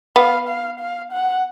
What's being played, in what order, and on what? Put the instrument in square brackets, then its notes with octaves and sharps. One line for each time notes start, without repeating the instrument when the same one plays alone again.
[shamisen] B3 [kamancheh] F5
[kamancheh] F5
F5
F#5